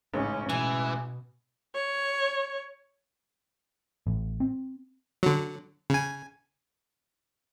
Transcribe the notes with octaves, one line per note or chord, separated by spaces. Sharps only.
A1 G#2 C#3 C#4
B2 E3 G#5
C#5
A1
C4
D3 F#3
C#3 G#5